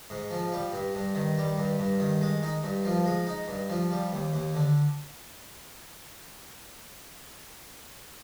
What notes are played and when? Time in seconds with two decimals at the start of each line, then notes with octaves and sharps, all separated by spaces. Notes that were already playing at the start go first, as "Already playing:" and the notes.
0.10 G#2
0.31 F3
0.52 G3
0.73 G2
0.95 G2
1.15 D#3
1.37 G3
1.58 G2
1.79 G2
2.00 D#3
2.21 G#3
2.43 D#4
2.63 G2
2.85 F3
3.05 G#3
3.27 D#4
3.48 G2
3.69 F3
3.91 G3
4.12 D#2
4.33 D#2
4.55 D3